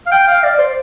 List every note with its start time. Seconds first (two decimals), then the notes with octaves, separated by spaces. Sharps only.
0.06 F5
0.11 G5
0.28 F5
0.43 D5
0.59 C5